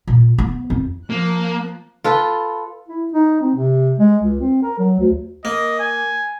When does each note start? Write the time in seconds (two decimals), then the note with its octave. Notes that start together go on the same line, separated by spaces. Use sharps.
0.07 A#2
0.38 B3
0.70 F2
1.10 F3 A#3 F#6
2.04 F4 A4 B4
2.88 E4
3.13 D#4
3.41 C4
3.55 C3
3.99 G#3
4.23 C#2
4.40 C4
4.63 A#4
4.79 F#3
4.99 D2
5.45 A#3 D#5
5.79 G#5